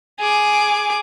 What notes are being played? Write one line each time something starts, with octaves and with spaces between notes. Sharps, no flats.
G#4 D6